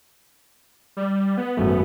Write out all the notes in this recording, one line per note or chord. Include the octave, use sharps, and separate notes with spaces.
G3
B3
G#1 F#2 A3